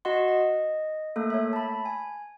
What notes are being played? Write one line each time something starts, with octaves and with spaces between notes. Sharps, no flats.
F#4 D#5 F#5 C6
D#5
A3 A#3 A4
C#5 E5
A5 B5
G#5